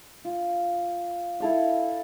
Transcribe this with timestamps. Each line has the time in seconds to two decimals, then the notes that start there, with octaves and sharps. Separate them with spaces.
0.25 F4
1.40 E4 A4 F5